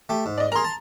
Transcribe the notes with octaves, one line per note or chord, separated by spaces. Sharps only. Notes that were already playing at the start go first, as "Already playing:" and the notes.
A3 G4
G#2
D5 D#5
G#4 A#4 A#5 C6
A5